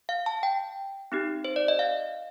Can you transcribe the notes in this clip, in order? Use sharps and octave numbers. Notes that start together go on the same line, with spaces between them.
F5
A5
G5
C4 D#4 G4
C5
D5
D#5
F5